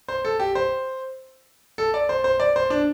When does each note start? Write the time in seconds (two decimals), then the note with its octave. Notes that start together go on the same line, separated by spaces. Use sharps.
0.08 C5
0.25 A4
0.40 G4
0.55 C5
1.78 A4
1.94 D5
2.09 C5
2.24 C5
2.40 D5
2.56 C5
2.70 D4